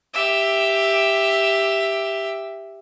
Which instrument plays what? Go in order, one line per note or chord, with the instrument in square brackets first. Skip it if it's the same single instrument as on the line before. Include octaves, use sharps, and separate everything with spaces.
[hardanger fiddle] G4 E5